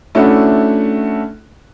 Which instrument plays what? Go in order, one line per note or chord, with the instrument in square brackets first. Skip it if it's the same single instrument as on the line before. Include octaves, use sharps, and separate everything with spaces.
[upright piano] A3 C#4 D4 E4 F#4